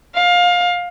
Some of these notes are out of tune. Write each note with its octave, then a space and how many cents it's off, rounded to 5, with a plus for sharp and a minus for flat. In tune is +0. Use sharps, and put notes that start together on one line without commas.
F5 +20